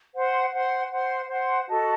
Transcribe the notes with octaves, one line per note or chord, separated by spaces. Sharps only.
C5 F#5 C6
C5 F#5 C6
C5 F#5 C6
C5 F#5 C6
F#4 A4 D#5 A5